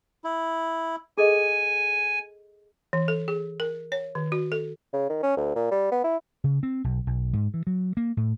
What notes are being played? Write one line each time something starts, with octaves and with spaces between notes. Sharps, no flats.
E4
G#4 A4 D#5 G#5
E3
A4
G#4
A#4
C#5
D#3
F#4
A4
C#3
D#3
C#4
D2
A#2
G3
B3
E4
C#3
C4
B1
B1
G#2
E3
F#3
A#3
A2